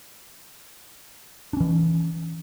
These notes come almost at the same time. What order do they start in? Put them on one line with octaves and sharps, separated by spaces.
D4 C#4 E3